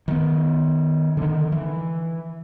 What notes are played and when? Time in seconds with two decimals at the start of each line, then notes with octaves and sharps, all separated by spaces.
0.08 D#3 B3
1.17 D3 D#3
1.52 E3